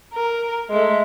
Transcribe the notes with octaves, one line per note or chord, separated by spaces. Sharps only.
A#4
G#3 A3